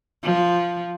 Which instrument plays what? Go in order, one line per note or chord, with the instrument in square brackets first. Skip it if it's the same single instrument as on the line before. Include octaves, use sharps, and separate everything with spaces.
[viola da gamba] F3